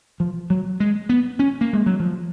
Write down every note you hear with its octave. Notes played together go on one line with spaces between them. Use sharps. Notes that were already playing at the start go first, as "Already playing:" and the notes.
F3
F#3
G#3
B3
C#4
A#3
G#3
F#3
F3